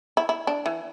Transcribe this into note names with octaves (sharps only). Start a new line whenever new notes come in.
E4
E4
D4
E3